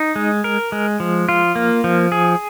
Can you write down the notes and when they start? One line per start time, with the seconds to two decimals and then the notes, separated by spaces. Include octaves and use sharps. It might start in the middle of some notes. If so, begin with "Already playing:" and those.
Already playing: D#4
0.16 G#3
0.44 A#4
0.72 G#3
1.00 F3
1.29 F4
1.56 A#3
1.84 F3
2.12 G#4